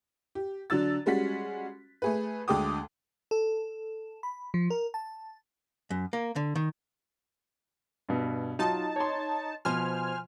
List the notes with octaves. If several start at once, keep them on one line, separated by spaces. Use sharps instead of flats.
G4
D3 F#3 D4 E6 A6
G3 G#3 C#4 F#4 B6
A3 G#4 B4
D2 D3 G#3 G5 D6 D#6
A4
B5
F3
A#4
A5
F#2
A#3
D3
D#3
G2 B2
F#3 D#4 F4 A5
C#5 C6
B2 F3 C5 G#5 F6